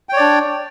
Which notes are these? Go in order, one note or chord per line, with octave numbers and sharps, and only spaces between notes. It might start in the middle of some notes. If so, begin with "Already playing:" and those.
D4 C#5 D5 G5